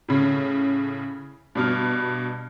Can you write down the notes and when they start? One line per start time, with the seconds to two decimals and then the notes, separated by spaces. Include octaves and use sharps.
0.08 A2 C#3
1.55 G2 B2 F6